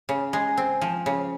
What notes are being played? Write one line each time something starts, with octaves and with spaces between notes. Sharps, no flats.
C#3 G#5
G#3 G#5
A#5
C4 G#5
F3
C#3